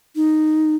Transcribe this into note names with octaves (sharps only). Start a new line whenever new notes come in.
D#4